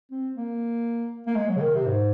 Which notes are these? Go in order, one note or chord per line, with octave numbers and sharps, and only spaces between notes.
C4
A#3
A#3
G#3
F#3
C#3
D#3
C3
G#2